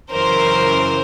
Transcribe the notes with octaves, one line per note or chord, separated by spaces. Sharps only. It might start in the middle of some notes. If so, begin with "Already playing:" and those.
F#2 C#3 E3 A#4 C5